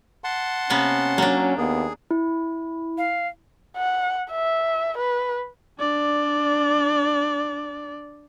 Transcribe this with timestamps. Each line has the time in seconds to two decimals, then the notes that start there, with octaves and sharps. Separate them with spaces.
0.24 F#5 A5 C6
0.70 C3 A#3 B3 C#4
1.18 F#3 A#3 D4
1.58 D#2 B3 G#4
2.11 E4
2.98 F5
3.76 F#5
4.32 E5
4.98 B4
5.79 D4 D5